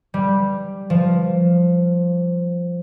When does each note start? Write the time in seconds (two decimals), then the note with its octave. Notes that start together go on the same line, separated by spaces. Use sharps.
0.14 G3
0.90 F3